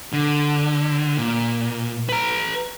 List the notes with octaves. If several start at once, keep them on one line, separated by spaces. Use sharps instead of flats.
D3
A#2
B4 A#5